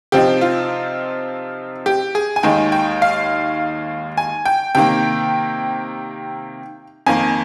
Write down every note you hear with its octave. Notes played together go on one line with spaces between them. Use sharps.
C3 F3 C4 D#4 G4
F4
G4
G#4
G#5
D#2 D#3 G#3 D#4 G5
G5
F5
G#5
G5
C3 D#3 A#3 G5
F2 D#3 A#3 G#5